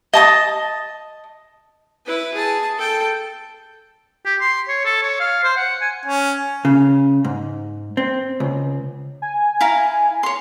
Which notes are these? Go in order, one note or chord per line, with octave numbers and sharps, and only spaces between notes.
D#5 A5 D#6
E4 B4
G#4 A5
A4 G5
G4
C6
C#5
A4
C#5
F5
C5
F#5
G#5
C#4
C#3
G#2
C4
C#2
G#5
E4 F5 A#5
C#5 C6